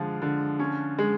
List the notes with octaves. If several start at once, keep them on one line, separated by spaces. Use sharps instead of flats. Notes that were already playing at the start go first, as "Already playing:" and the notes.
Already playing: D3 F3 G#3
D3
C#4
G#3